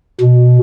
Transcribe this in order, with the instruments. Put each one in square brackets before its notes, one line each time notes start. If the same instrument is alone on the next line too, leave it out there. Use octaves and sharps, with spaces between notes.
[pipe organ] B2